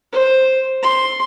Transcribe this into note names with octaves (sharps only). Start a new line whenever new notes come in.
C5
C6